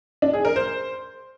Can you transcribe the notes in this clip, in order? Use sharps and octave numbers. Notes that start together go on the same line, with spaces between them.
D4
G#4
A#4
C5